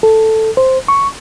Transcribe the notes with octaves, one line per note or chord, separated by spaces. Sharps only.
A4
C5
C#6